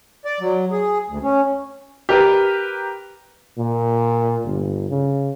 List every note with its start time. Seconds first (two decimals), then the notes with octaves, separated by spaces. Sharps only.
0.25 D5
0.40 F#3
0.72 G#4
1.09 D2
1.23 C#4
2.09 G4 A#4 B4
3.58 A#2
4.45 G1
4.90 C#3